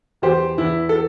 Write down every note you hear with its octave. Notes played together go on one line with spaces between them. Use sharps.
E2 G4 C5
E2 E4
A4